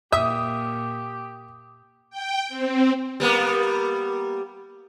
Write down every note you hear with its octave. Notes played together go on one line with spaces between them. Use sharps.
A#2 G4 E5 D#6
G5
C4
G3 A#3 B3